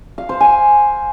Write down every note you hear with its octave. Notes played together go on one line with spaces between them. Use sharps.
F5
C5
G#5